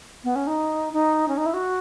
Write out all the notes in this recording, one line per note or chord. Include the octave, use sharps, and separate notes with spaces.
B3
C#4
D#4
D#4
C#4
D#4
E4
F#4